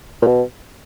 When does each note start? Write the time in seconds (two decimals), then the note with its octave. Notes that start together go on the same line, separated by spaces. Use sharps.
0.22 A#2
0.27 B2